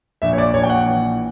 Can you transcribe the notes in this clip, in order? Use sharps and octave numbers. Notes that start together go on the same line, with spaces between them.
A#1 E5
C#5
D5
A#1 C#5
G5
F#5
E3